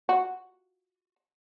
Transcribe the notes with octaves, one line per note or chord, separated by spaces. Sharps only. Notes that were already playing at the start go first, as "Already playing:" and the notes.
F#4